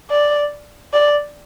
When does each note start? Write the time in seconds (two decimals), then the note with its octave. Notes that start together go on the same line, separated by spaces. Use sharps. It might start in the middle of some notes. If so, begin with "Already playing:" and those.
0.11 D5
0.93 D5